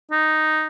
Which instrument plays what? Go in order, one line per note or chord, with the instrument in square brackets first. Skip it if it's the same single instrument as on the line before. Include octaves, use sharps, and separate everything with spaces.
[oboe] D#4